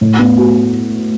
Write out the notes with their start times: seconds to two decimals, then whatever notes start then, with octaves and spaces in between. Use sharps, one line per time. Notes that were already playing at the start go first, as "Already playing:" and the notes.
0.01 A2
0.19 B3
0.38 F#4